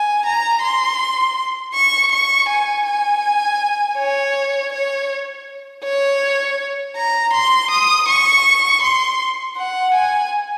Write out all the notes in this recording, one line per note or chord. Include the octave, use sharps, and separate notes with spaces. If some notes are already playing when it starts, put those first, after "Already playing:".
Already playing: G#5
A#5
C6
C#6
C#6
G#5
G#5
C#5
C#5
C#5
A#5
C6
D#6
C#6
C6
F#5
G#5